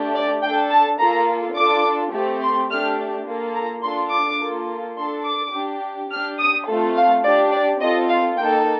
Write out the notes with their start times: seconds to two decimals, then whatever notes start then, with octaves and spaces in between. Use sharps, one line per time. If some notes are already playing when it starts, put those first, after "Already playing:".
Already playing: A3 D4 G4
0.15 D5
0.43 D4 A4 G5
0.71 A5
1.00 A#3 F4 A4 A#5
1.57 D4 F4 A4 D6
2.13 A3 C4 G4
2.42 C6
2.70 A3 D4 G4 F6
3.27 A#3 F4 A4
3.56 A#5
3.84 D4 F4 A4 C6
4.12 D6
4.41 A#3 F4 A4
4.97 D4 A4 C6
5.25 D6
5.53 D4 G4
6.10 D4 G4 F6
6.39 D#6
6.67 A3 C4 F4 A4
6.96 F5
7.24 D4 G4 D5
7.53 D5
7.81 C4 F4 A4 D#5
8.09 F5
8.37 A#3 D#4 A4 G5